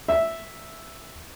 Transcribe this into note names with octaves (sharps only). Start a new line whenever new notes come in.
E5